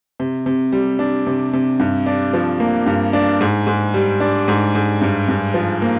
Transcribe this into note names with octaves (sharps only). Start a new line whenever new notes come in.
C3
C3
G3
D4
C3
C3
G2
D4
F3
A#3
G2
D4
G#2
G#2
G3
D4
G#2
G#2
G2
G2
F3
A#3